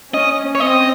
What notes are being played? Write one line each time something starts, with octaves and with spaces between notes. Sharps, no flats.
C#4 D#5
C#5
C4 D#5